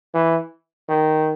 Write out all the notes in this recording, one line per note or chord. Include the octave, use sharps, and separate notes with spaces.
E3
D#3